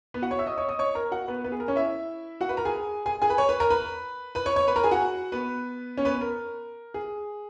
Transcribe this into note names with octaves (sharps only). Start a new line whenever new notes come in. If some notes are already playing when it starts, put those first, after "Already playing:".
B3 B4
F#4 F#5
C#5 C#6
E5 E6
D#5 D#6
C#5 C#6
D#5 D#6
C#5 C#6
A#4 A#5
F#4 F#5
B3 B4
B3 B4
G#4
A#4
C#4 C#5
E4 E5
F#4 F#5
B4 B5
A#4 A#5
G#4 G#5
G#4 G#5
G#4 G#5
B4 B5
C#5 C#6
B4 B5
A#4 A#5
B4 B5
B4 B5
C#5 C#6
C#5 C#6
B4 B5
A#4 A#5
G#4 G#5
F#4 F#5
B3 B4
C#4 C#5
B3 B4
A#4
G#4